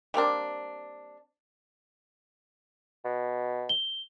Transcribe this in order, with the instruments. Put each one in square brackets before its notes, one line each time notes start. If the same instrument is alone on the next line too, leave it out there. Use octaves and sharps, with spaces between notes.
[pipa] G3 A#3 C4 D4
[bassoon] B2
[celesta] G7